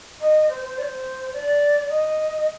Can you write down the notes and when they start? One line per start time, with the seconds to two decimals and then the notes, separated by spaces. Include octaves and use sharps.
0.21 D#5
0.49 C5
0.64 C5
0.78 D5
0.83 C5
1.33 D5
1.89 D#5